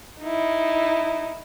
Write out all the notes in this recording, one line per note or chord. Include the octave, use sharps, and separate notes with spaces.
D#4 E4